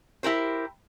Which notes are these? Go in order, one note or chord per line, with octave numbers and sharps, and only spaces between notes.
E4 G4 A#4 C5